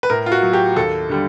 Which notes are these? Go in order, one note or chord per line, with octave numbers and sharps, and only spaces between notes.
B4
A2 A#4
F4
F#4
F#3
G4
D#2 A4
D3 G3